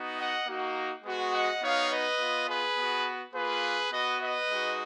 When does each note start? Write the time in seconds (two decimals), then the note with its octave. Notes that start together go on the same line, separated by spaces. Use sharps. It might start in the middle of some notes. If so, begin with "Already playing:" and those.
Already playing: B3 D#4 F#4
0.17 D#5 F#5
0.46 A#3 D#4 F#4
1.04 G#3 B3 F#4
1.33 D#5 F#5
1.61 B3 D#4 F#4 C#5 F5
1.90 B4 D#5
2.19 B3 F4
2.48 G#4 B4
2.77 B3 F#4
3.33 A#3 F4 G#4 B4
3.91 B3 F#4 B4 D#5
4.20 B4 D#5
4.49 G#3 D#4 F#4